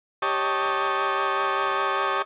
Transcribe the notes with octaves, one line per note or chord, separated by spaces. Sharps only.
G4 C#5 D#5 A5